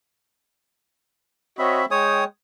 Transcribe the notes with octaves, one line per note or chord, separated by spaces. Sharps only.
C4 F#4 C#5 D#5 E5 B5
G#3 C#5 G5 D#6